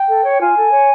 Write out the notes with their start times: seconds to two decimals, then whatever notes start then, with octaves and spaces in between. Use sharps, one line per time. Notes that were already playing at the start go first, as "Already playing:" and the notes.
Already playing: G5
0.08 A4
0.24 C#5
0.40 F4 G#5
0.56 A4
0.71 C#5